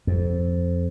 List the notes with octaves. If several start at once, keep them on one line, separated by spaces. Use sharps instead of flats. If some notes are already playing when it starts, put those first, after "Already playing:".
F2